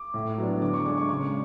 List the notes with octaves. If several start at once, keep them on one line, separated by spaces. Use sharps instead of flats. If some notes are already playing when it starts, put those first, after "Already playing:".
Already playing: D6
A2
F#3 B3 D4
D3 D6
C#6
G#3 D4 D6
C#6
C#3 C#6